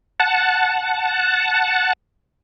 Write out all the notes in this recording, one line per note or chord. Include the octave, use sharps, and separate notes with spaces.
F#5 A5